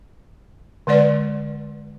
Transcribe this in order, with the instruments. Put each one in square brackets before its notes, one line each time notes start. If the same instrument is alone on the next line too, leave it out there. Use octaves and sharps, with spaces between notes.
[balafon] D3 G#3 B4 D5